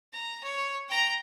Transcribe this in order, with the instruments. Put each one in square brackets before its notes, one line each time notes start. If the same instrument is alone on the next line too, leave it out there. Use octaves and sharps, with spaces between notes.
[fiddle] A#5
C#5
G5 A#5